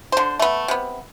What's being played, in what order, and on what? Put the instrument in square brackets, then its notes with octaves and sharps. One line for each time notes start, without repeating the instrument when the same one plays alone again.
[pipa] D3 C5
A3 B3
C3 B3